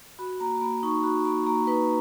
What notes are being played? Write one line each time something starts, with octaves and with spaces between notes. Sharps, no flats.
F#4 B5
A#3 A#5
A#3 B5
D#4 C#6
F#4 B5
A#3 B5
A#3 A#5
D#4 B4